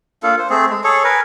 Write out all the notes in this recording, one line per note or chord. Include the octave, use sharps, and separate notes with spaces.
A#3 D4 F4 A4
C5
A3 C4 G#4
G#3
G#4 A4 C#5
A#4 B4 G#5